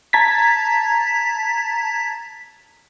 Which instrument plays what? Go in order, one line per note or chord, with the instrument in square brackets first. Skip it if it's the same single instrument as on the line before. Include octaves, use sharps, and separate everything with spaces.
[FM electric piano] A5 A#5 G#6 A6 B6